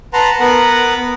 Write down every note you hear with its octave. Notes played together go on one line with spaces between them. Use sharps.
B4 F#5 A5 A#5 C6
B3 A#4 B4 F#5